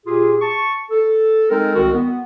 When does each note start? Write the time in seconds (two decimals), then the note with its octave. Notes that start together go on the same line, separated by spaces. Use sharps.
0.06 A#2 F4 G4 G#4
0.41 A5 C#6
0.91 A4
1.49 G#3 C4 D#4 A4 A#4
1.75 C2 D#3 G#3 C4 F#4 A#4
1.93 B3